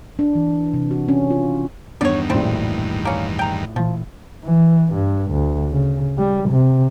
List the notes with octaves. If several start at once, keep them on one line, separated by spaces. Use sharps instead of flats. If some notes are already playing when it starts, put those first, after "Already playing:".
D4
E3
C3
F#4
C#4
F4
E2 G2 D#3 B3 D4 C#5 D5
A#1 A2 G3 C4
A#3 C#4
G5 A#5
A#2 E3 F3
E3
G2
D2
C#3
G3
C3